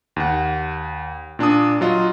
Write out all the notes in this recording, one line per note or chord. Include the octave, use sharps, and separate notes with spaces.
D#2 F#5
A#2 D4 A5 D#6
F#3 F4 D#5